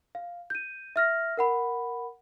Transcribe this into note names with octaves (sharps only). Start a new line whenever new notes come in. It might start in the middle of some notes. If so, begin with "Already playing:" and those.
F5
G6 D#7
E5 F6 A#6
A#4 F#5 B5